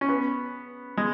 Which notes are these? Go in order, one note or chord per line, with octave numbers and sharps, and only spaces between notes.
C#4
B3
G#3